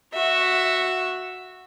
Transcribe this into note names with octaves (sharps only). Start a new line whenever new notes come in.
F#4 E5